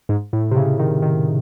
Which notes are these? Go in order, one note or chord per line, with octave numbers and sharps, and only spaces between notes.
G#2
A2
C3
C#3
D#3
D#3